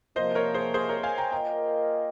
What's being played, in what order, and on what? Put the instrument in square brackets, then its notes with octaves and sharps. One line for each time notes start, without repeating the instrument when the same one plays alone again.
[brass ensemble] C3 F3 A#3 [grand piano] C5 D#5
[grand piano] A#4 C#5
G#4 C5
G#4 C5
A#4 C#5
F5 G#5
G5 A#5
[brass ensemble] A#3 F4 A#4 D#5 [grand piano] G5 A#5